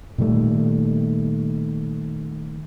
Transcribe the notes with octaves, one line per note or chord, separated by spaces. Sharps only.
A#2 D#3 G3 A3